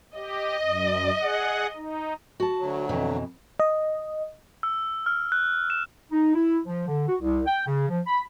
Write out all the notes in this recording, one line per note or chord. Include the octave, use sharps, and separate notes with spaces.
G4 D#5
F#2
G#4 F#5
D#4
F#4 A5
D2 F#3
F2 B2 E3
D#5
E6
F6
F#6
E7
D#4
E4
F3
D3
F#4
C2
G5
C#3
F3
B5